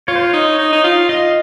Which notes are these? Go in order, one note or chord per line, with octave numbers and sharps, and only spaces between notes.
F4 C#5
C5
C#5
D#4
D#4
D#4
F4
F4 D#5